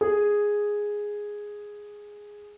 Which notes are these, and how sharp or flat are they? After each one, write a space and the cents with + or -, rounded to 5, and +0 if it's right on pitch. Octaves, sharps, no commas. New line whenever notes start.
G#4 -5